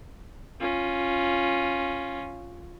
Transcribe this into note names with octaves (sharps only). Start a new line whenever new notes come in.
C#4 F4